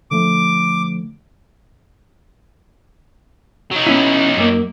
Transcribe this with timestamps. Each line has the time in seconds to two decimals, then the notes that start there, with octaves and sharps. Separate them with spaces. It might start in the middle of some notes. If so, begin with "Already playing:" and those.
0.11 D3 F3 A3 D6
3.71 F#3 D#4
3.87 B3 C#4 E4
4.37 F#2 A#3